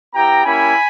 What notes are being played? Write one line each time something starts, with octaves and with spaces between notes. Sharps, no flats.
B3 E4 G4 G5 A#5
A#3 C#4 E4 G4 G#5 B5